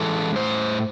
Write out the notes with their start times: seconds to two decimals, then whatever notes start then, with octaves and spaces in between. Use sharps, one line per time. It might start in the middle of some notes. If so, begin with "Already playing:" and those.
Already playing: E3 G#3 C#4 A4
0.35 A2 C5